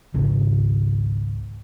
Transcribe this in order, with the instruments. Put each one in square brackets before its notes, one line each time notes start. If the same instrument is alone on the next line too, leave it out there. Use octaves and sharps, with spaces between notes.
[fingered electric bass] G#1 C#2 C#3